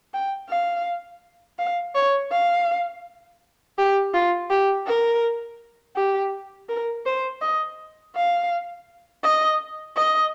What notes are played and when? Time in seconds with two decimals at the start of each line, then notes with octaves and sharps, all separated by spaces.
0.14 G5
0.49 F5
1.59 F5
1.95 C#5
2.31 F5
3.78 G4
4.14 F4
4.50 G4
4.86 A#4
5.96 G4
6.69 A#4
7.06 C5
7.41 D#5
8.15 F5
9.24 D#5
9.97 D#5